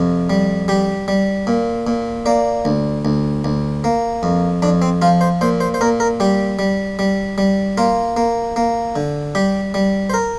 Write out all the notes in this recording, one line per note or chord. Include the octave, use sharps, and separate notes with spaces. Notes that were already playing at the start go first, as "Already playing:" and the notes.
Already playing: F2 C3
G3
G3 G4
G3
A#2
A#2
A#3 D5
D2
D2
D2
A#3
F2
F2 D4
C4
F3 F4
C5
A#2 C5
C5
C5
A#2 A#4
A#4
G3 G4
G3
G3
G3
A#3 F4
A#3
A#3
D3
G3 G4
G3
C5
A#4